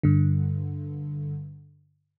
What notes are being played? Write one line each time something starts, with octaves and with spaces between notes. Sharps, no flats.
G2 D3